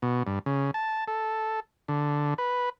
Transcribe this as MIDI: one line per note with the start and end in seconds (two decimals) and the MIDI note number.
0.02 0.23 47
0.27 0.39 43
0.46 0.71 49
0.74 1.04 81
1.08 1.60 69
1.88 2.34 50
2.38 2.69 71